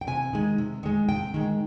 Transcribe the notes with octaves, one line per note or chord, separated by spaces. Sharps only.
G5
C3 G#5
D#3 G#3
C3
D#3 G#3
C3 G5
D#3 G#3